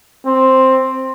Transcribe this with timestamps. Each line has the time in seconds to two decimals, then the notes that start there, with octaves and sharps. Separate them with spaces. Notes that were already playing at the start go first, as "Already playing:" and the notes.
0.26 C4